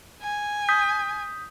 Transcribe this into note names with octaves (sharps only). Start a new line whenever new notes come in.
G#5
D#6 G6 B6